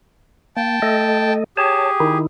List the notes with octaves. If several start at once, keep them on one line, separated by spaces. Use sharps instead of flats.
A#3 G5 A5
A3 A4 D#5
G4 G#4 C#5 A5
D#3 D#4 E4